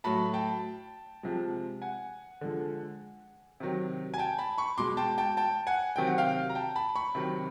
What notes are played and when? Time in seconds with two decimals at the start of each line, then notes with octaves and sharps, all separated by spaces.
0.04 A2 F#3 A5 B5
0.34 G5 A5
1.23 C3 F3 G#3
1.82 F#5 G#5
2.41 D3 F3 G#3
3.60 C3 D#3 F#3
4.14 G#5
4.18 G5 A5
4.38 A5 B5
4.58 B5 C#6
4.78 B2 G#3 C6 D6
4.97 G5 A5
5.18 G5 A5
5.37 G5 A5
5.67 F#5 G#5
5.96 C3 D#3 F#3 G5
6.07 F#5
6.18 F5 G5
6.49 A#5
6.55 G5 A5
6.76 A5 B5
6.96 B5 C#6
7.15 C3 D#3 F#3